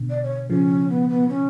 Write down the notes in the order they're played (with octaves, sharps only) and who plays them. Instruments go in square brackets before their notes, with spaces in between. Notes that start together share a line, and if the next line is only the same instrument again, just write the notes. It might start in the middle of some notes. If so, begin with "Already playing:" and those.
Already playing: [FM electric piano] B2 D3
[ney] D5
C#5
[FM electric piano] C#3 F3 [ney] C#4
[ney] B3
B3
C#4